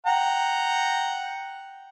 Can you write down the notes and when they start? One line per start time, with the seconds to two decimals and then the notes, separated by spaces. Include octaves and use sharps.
0.06 F#5 G5 A#5